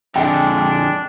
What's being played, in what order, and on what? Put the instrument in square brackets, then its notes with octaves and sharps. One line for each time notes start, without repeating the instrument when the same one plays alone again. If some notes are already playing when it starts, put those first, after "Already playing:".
[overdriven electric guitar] F2 D3 [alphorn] G#3 [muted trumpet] D4 [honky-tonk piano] G5